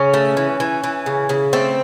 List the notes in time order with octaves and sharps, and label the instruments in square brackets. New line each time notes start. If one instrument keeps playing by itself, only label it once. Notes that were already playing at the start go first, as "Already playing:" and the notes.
Already playing: [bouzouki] C#3 C#4
A3
E3
E3
E3
C#3
C#3
A3 C4